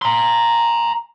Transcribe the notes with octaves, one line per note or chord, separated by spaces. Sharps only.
A#5 C6